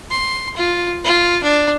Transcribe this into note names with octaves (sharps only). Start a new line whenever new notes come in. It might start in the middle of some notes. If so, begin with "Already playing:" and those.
C6
F4
F4
D4